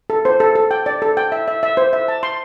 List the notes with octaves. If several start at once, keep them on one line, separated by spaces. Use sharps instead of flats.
A4
C5
A4
A4
G5
D5
A4
G5
E5
E5
E5
C5
E5
A5
C6